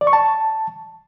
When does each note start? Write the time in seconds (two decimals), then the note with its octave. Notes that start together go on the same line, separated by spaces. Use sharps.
0.01 D5
0.07 C#6
0.13 A5